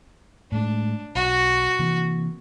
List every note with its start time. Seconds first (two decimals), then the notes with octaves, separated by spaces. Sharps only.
0.52 A2 G#3 D4
1.15 B1 F#4
1.79 C3 E3 A#3